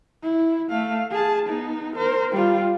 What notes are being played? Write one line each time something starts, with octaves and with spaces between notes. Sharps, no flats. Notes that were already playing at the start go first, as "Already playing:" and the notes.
E4
A3 F5
G#4 A5
B3 D#4
A#4 C5
G3 F4